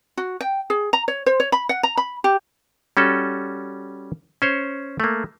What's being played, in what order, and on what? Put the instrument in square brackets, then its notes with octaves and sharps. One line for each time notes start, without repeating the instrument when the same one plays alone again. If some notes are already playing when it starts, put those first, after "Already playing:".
[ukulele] F#4
G5
G#4
A#5
C#5
C5
C#5
B5
F#5
A#5
B5
G4
[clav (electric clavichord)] G3 C#4 F#4 A4
C#4 C5 C#5
A3 A#3